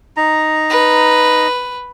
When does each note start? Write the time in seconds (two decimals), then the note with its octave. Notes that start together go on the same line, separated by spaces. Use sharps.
0.17 D#4 A#5
0.70 B4